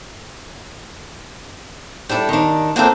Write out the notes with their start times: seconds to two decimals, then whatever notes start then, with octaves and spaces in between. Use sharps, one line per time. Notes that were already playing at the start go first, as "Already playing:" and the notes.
2.09 G3 D4 E4 A4
2.29 D#3 D4
2.76 A#3 C4 D4 D#4 F4 A4